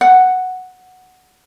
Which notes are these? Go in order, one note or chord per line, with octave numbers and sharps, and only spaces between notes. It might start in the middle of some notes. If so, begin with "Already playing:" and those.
F#5